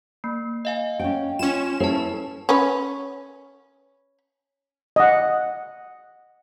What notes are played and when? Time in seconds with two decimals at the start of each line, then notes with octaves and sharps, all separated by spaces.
0.24 A#3
0.65 D#5 F5 G#5
1.00 C#4 G5
1.39 C#4 F4 E7
1.80 E4 A4 B4 C#5 A5
2.49 C#4 B4
4.96 D#5 F#5